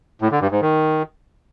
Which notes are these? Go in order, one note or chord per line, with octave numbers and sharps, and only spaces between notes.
A2
D3
G2
G#2
D#3